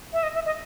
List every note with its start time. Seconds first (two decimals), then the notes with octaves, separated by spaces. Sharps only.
0.13 E5
0.23 D#5
0.34 E5
0.46 D#5